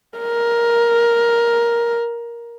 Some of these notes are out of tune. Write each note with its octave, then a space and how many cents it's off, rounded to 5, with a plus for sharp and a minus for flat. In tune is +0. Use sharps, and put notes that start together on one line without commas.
A#4 +10